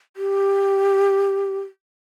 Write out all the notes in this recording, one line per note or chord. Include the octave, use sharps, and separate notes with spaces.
G4